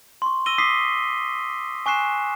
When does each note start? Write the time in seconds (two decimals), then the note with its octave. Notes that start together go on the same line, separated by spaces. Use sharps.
0.22 C6 C#6
0.46 C6 E6 A#6 D#7 G7
0.58 D6 D#6 B6 C7
1.86 G#5 C#6 F#6 C7 E7